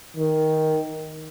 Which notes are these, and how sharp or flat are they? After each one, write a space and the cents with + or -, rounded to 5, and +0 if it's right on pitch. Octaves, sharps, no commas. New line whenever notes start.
D#3 +10